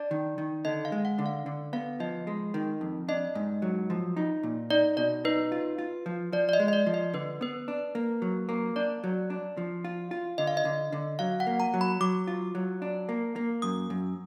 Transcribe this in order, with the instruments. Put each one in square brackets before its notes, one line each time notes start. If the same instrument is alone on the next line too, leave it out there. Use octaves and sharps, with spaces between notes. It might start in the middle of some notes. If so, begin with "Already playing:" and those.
Already playing: [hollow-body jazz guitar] D4 [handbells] D5
[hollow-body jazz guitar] D#3
D#3
[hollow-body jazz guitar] D3 [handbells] D#5
[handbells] F5
[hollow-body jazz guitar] G#3
[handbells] F#5
[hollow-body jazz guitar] D3
[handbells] F5
[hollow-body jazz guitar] D3
[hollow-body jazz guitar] B3 [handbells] F5
[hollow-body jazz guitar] F3 [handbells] D#5
[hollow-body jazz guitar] G#3
D#3
F2
[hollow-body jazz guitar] D4 [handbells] D#5
[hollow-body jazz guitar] G#2
F#3
F3
D#4
A#2
[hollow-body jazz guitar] D#4 [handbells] D5
[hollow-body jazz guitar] B2 [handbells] D5
[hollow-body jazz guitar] D#4 [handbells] B4
[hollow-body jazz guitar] F4
F4
F3
[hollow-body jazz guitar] F3 [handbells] D5
[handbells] D5
D#5
[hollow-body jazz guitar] G#3
[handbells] D#5
D5
[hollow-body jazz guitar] F3
[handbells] D#5
[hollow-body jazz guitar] D3 [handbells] B4
[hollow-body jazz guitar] B3 [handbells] B4
[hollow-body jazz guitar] D4
A#3
F#3
A#3
[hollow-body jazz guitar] D4 [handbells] D5
[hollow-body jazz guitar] F#3
D4
F3
F4
F4
[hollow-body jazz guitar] D3 [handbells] D#5
[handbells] F5
D#5
[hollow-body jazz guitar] D3
D3
[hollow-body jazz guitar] F#3 [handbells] F5
[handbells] F#5
[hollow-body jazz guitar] A#3
[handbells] A#5
[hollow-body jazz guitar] F#3
[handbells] B5
[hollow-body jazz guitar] F#3 [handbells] D6
[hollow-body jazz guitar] F4
F#3
D4
A#3
A#3
[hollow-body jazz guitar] F#2 [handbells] D#6
[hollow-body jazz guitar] F#2